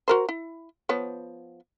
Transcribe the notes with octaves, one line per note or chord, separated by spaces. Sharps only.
F#4 A#4 C5
E4
F3 B3 C#5